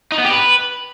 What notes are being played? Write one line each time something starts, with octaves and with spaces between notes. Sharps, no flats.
D#4
B3
G4
B4